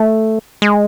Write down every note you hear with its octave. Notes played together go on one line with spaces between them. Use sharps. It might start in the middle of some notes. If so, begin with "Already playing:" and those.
Already playing: A3
G#3